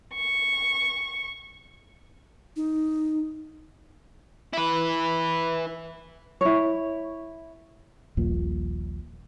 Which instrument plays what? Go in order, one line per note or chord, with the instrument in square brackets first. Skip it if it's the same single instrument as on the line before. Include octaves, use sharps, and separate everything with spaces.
[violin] C#6
[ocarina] D#4
[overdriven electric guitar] E4 B4
[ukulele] E4 C#5
[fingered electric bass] D#1 A#1 A#2